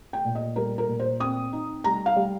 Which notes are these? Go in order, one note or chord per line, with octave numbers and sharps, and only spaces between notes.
G5
A#2
D#5
G3 A#4
A#4
A#2
C5
C4 D#6
D#4
G3 A#5
F5
G3